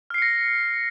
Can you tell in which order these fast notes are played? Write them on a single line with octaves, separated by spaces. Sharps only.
F6 C7 C#7 A#6